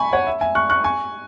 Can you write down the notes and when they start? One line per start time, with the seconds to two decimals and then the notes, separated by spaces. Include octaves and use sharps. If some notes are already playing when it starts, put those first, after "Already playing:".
Already playing: G#5 B5 C#6
0.13 C#5 F#5
0.27 E5
0.41 E5 G#5
0.55 C#6 F#6
0.70 C#6 F#6
0.84 G#5 C#6